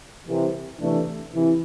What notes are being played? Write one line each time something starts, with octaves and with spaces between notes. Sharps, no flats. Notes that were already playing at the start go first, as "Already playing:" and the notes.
C2 C3 E3
C3 E3 A3 D4
C3 E3